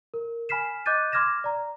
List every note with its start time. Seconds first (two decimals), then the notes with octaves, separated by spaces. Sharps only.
0.14 A#4
0.49 G#5 B5 F6 B6 C7 E7
0.86 D#5 D6 F#6 G6 A6 D#7
1.12 C6 D6 F6 G#6 A#6 E7
1.44 D5 A#5